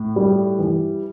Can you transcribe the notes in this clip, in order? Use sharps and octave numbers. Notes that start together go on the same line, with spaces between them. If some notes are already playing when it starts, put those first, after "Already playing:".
Already playing: A2
G3
E3